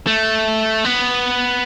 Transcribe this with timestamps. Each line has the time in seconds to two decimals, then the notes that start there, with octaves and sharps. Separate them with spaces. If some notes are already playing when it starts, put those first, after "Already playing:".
0.07 A3
0.85 B3